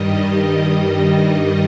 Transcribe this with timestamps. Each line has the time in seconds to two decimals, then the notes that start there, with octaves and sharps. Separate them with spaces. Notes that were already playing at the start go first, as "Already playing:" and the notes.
Already playing: G2 D#3 G3 D#5
0.19 D#5